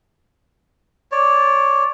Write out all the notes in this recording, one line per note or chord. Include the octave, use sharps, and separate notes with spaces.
C#5 D5